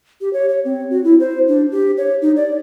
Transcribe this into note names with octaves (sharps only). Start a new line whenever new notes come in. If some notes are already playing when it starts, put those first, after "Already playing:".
G4
C#5
C#5
C4
F#4
E4
C5
D4
G4
C#5
D#4
D5